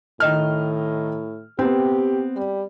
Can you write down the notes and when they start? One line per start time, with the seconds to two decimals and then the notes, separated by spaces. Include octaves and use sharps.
0.20 A2 D#3 D#5 F6
1.59 B3 C4 G4
2.36 G3